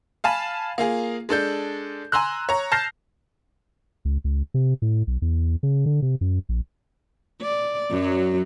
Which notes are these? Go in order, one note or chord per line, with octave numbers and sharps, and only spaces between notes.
F5 G#5 A5 B5
A#3 F4 G#4
G#3 D4 A4 G6
G#5 A#5 C6 E6 F#6
C#5 A#5
A5 F6 G6 A#6 C7
C#2
C#2
C3
A2
B1
E2
C#3
D3
C3
F#2
A#1
D5
F#2 F#3